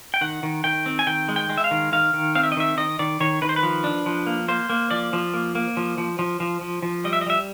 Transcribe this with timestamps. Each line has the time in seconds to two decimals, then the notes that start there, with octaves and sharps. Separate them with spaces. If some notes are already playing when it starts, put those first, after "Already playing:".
0.14 G5
0.21 D#3 F#5
0.43 D#3
0.64 D#3 G5
0.86 C4
0.99 G#5
1.07 D#3 G5
1.29 G#3
1.36 G5
1.49 G#3
1.58 E5
1.64 F5
1.71 D#3
1.93 D#3 F5
2.14 D#3
2.35 C4 F5
2.43 E5
2.52 D#5
2.57 D#3 E5
2.77 D#3 D#5
2.99 D#3 D5
3.20 D#3 C#5
3.42 D#3 B4
3.49 C5
3.56 B4
3.63 F3
3.84 D4
4.06 F3
4.27 A#3
4.48 A#3 C5
4.70 A#3
4.91 F3 D5
5.13 F3
5.34 A#3
5.55 A#3
5.77 F3
5.98 F3
6.19 F3
6.40 F3
6.61 F3
6.83 F3
7.04 G3 D#5
7.13 E5
7.21 D#5
7.26 G3 E5